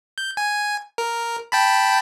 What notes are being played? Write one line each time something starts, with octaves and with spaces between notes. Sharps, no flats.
G6
G#5
A#4
G5 A5 B5